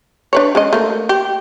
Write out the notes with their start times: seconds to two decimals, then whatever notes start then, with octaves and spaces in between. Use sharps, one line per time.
0.33 D4 B4 C#5
0.55 G#3 C#4 D#5
0.73 A3 A#3
1.09 G4